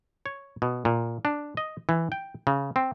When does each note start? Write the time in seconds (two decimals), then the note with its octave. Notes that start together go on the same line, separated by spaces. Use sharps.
0.26 C#5
0.62 B2
0.85 A#2
1.25 D4
1.57 D#5
1.89 E3
2.12 G5
2.47 C#3
2.76 C4